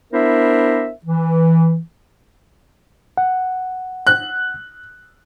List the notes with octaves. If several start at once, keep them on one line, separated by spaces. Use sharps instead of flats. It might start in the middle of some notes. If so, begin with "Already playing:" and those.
B3 D4 E4 A#4 C5 E5
E3
F#5
F#6